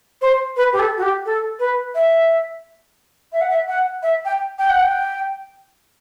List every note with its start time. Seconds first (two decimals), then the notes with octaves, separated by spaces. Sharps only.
0.22 C5
0.57 B4
0.73 G4
0.79 A4
0.97 F#4
1.02 G4
1.26 A4
1.59 B4
1.95 E5
3.33 E5
3.41 F#5
3.50 E5
3.68 F#5
4.03 E5
4.25 G5
4.59 G5
4.69 F#5
4.81 G5